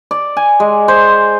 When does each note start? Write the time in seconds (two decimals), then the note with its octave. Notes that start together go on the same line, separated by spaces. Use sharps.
0.11 D5
0.37 G#5
0.60 G#3
0.88 C5